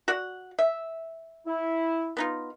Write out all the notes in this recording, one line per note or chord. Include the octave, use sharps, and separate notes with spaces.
F#4 D5 F#5
E5
E4
B3 D#4 F4